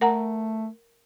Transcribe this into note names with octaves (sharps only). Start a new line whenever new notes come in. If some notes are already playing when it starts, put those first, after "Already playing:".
A3 A#4 F#5 A#5